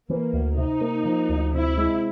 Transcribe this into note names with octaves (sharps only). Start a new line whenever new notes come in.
E3 A#3
D2
C3 D#4
A#3
F3
D2
C3 E4
G#3